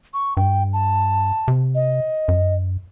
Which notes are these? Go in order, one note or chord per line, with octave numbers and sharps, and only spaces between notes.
C#6
G2 G5
A5
C3
D#5
F#2